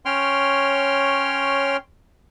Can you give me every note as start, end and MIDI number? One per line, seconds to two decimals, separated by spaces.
0.05 1.77 61
0.05 1.77 73
0.05 1.77 79
0.05 1.77 84
0.05 1.77 89